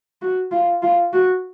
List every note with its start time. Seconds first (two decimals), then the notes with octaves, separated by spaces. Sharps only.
0.22 F#4
0.51 F4
0.82 F4
1.13 F#4